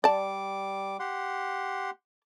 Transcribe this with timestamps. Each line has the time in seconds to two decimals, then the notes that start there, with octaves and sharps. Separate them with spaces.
0.04 G3 D5 A5 D6
1.00 G4 F#5 C6